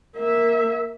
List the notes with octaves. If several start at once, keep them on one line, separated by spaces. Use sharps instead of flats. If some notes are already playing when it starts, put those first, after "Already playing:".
A#3 E5